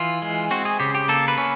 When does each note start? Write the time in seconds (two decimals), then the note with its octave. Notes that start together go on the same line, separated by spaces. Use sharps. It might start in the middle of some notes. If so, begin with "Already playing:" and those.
Already playing: E3 F4
0.22 G#3
0.51 C4 F#4
0.65 G#4
0.80 C#3 G4
0.95 G4
1.09 A#3 A4
1.28 B4
1.38 C#4